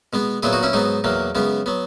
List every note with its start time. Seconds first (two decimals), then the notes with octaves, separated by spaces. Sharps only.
0.13 B2 G#3 B3
0.43 A#2 F#3 B3 E4 G#4
0.53 D#4 F#4
0.63 C#4 E4
0.73 G#2 F#3 B3 D#4
1.04 E2 B2 F#3 A#3
1.35 F#2 C#3 G#3 B3
1.66 F#3 B3